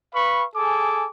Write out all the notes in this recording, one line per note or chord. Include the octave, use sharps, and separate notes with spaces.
B4 F5 B5 C#6
G#4 A4 G#5 D6